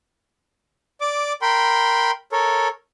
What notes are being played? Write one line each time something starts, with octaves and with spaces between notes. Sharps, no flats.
D5 D6
A#4 G5 B5 C6
A4 A#4 C#5